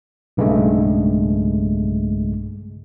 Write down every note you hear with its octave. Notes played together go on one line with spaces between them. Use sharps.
B1 G2 C#3 G#3 A3